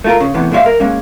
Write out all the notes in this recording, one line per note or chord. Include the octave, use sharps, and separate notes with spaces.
A3 F4 A#4
C#3
E2 A2 C3 B3
A#2 G#3 F#4 C#5 E5 F5
A#4
G#3 A#3 C#4